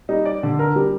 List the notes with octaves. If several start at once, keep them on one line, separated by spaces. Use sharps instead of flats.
G3 D#4
D5
D3
A#4
G3